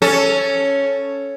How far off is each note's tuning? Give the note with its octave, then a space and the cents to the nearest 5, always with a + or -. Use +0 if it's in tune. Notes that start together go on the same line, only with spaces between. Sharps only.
C#4 +0 A4 +0